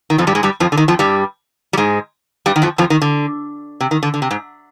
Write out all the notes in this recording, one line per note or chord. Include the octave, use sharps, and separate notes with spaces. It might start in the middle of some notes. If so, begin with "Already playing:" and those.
D#3
F2 F3
G2 G3
G#2 G#3
G2 G3
F2 F3
D3
D#3
F2 F3
G2 G3
G3
G#2 G#3
G2 G3
D#3
F2 F3
F2 F3
D#3
D3
C3
D#3
D3
D3
C3
G#2